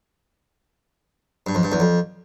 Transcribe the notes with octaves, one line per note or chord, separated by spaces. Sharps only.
G2
F2
G2
E2
F2